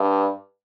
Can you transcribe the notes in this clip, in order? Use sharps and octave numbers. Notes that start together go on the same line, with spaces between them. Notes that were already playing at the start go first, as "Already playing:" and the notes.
Already playing: G2